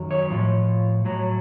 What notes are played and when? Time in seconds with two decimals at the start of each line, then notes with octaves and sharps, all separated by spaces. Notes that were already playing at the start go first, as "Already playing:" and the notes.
Already playing: F#2 D#3 F#3
0.11 C#5
0.30 A2 F3
1.05 A2 F#3